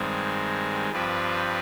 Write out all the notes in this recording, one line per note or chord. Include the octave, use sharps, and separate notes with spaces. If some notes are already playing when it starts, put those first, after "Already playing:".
Already playing: G2 D#3 G#3 C4
G2 F3 C4 G4 B4